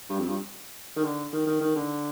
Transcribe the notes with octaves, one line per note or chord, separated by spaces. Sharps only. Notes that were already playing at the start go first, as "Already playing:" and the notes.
G2
F2
G2
D#3
D3
D#3
D#3
D#3
D3